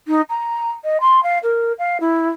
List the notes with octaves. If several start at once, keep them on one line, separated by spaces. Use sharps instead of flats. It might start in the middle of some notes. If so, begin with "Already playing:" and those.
D#4
A#5
D#5
C6
F5
A#4
F5
E4